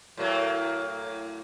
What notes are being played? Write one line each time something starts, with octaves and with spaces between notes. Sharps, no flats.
A2 F#3 A#3